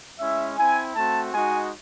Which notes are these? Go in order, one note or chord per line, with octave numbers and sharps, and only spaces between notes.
G#3 C#4 E4 E5
C4 E4 G#5
A3 C4 F#4 A5
G#3 D#4 F#4 G#5